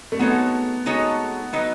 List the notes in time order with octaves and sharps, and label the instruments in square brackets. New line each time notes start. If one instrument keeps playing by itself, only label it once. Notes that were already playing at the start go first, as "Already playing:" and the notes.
[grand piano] A3
[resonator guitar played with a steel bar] G#3 D#4 F#4 A4 C#5 [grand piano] B3
[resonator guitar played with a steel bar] G#3 D#4 F#4 A4 C#5
F#3 B3 D#4